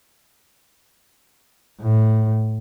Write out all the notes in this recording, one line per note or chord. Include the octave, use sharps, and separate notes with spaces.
A2